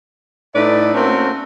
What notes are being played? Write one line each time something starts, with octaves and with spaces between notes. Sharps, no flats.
A2 D#4 B4 D5 E5
A3 A#3 C4 C#4 F#4 A#4